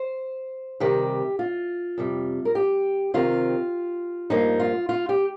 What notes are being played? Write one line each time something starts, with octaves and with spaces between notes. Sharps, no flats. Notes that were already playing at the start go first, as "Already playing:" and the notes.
Already playing: C5
C3 D#3 G3 G4
F4
F2 C3 G3
A#4
G4
C3 D#3 C4 F4
G2 F3 A#3 D#4
F4
F4
G4